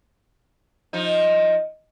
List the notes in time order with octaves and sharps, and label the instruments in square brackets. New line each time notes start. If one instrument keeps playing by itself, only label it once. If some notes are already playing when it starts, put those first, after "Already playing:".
[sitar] F3 D#4